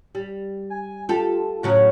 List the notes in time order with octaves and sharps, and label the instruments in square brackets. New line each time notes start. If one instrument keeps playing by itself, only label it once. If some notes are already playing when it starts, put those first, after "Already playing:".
[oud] G3
[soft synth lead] G#5
[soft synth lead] F4 [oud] G4 A4
[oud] A2 C#3 F#3